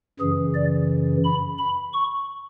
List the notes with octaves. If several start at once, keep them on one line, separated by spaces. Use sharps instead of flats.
F#2 C#3 E3 G#4
D5
B5
B5
C#6